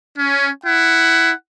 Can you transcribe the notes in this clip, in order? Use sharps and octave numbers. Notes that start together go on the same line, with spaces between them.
C#4
E4 F#5